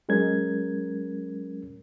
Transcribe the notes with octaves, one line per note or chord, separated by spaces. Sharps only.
F#3 G#3 C#4 A#4 G#6